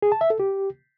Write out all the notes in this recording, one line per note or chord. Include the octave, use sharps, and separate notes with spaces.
G#4
A5
E5
A4
G4